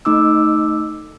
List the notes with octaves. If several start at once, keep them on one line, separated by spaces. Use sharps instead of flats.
A3 D#4 D6 E6